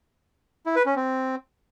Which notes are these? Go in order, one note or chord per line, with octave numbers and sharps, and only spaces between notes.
E4
B4
C#4
C4